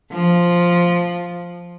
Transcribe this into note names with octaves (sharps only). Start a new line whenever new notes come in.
F3